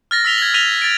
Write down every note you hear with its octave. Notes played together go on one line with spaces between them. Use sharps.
F6 A6 A#6
E6 B6 F7 G7
G#6 F#7
F6 A#6 B6 D#7 F7 G7
A6 D7